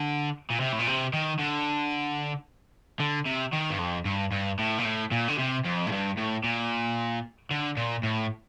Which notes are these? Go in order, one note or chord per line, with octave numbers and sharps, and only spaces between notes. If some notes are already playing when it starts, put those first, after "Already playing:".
Already playing: D3
A#2
C3
A2
A#2
C3
D#3
D3
D3
C3
D#3
G2
F2
G2
G2
A2
A#2
A2
A#2
D3
C3
F2
A2
G2
A2
A#2
D3
A#2
A2